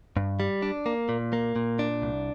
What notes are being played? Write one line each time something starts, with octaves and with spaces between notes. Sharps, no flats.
G2
G3
D4
A#3
A#2
A#3
A#2
D4
C2